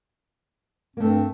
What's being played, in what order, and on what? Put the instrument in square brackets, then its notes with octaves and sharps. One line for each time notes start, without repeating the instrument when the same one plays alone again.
[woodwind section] G2 C4 [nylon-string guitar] A3 A#3